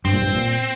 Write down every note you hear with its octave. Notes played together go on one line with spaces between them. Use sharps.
G2 C4
A#2
G2
A#2